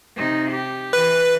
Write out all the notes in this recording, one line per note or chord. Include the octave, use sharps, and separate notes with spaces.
C3 D#4
G4
E3 B4